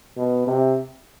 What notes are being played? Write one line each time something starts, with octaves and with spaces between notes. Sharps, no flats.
B2
C3